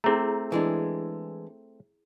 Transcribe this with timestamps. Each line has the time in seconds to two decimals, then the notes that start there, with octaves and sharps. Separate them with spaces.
0.04 A3 C4 E4 G#4 A#5
0.52 E3 G#3 D4